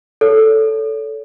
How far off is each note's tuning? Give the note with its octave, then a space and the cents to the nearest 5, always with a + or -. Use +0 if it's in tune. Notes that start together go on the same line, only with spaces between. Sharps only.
A4 +0 C#5 +30